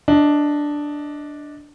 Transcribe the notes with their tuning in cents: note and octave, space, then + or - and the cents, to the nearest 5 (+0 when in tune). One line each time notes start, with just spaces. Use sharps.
D4 +0 D#5 +15